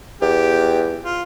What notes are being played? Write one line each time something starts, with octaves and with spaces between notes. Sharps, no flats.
E2 G4
F4